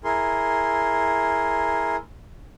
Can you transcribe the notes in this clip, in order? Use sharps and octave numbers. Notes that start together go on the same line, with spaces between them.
E4 G#4 A#4 C6